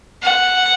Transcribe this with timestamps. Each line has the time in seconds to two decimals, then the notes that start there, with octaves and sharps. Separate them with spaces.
0.23 F#5